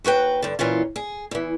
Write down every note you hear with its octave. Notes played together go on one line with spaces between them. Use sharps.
D#2 F#4 B4 G5
G2 D3
A#2 E3 C#4 F4
G#4
E2 E3